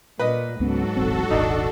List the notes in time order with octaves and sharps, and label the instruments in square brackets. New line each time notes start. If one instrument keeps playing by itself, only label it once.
[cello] A#2 [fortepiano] B4 D#5
[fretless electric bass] C#2 B3 C#4 [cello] G#2 F#3 [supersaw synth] F#4 A4
[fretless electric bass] D#1 A1 C4
[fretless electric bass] D#1 G#1 [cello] D4 [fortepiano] D#4